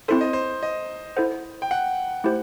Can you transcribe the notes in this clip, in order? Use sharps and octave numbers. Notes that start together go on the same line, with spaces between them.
C4 E4 A4 C5
D#5
C5
D#5
E4 A4 C5 F#5
G5
F#5
A3 E4 G4 C5